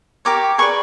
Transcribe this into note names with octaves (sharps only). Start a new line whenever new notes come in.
G4 A#4 C#5 D6
G#4 B4 D5 C#6